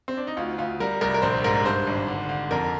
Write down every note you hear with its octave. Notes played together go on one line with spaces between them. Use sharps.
C4
D4
D#4
D2 F4
D2 F4
G3 A#4
C2 A#4
A#4
A#1 C5
G#2 A#4
G2 C5
G#1
D3
D3
F2 A#4